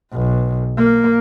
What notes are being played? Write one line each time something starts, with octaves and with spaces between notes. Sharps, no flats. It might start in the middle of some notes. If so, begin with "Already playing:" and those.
B1
A#3